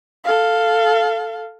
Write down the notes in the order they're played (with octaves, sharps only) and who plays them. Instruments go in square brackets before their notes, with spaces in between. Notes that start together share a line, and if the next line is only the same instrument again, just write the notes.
[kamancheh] A4 F5